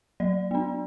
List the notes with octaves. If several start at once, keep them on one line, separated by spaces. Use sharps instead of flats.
F#3 D5
B3 D4